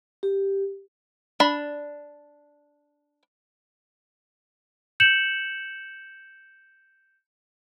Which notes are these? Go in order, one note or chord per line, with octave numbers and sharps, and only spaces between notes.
G4
D4 B5
G6 C#7 E7 F#7